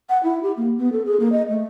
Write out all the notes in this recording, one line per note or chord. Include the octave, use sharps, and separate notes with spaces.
F#5
E4
G4
A#3
B3
A4
G#4
A#3
D#5
A3